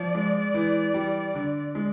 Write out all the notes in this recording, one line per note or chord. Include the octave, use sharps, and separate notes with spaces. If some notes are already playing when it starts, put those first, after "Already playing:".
Already playing: F3 D5
G#3
E3
G3
D3
G#3